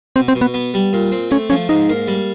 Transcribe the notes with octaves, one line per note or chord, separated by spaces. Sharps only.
B2 C4
C4
B2
B3
B3
G3
A#2
C4
A3 C#4
F3 C#4
G#2 D#4
A#3
G3